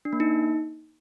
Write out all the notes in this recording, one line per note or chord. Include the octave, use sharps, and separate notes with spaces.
D4
A#3
D#4